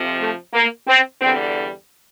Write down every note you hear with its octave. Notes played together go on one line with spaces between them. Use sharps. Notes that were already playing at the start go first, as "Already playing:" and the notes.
Already playing: F2 C3 F3
A3
A#3
C4
E2 D3 G3 C4